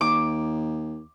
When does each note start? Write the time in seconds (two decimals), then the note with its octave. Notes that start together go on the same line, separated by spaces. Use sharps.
0.01 D#2 D6